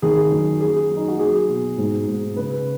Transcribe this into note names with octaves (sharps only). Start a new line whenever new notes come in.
D#3 G#4
F#2
F#3 G#4
F#3
D#4
F#4
F#3 G#4
B2
G#2
G#2
C#3 B4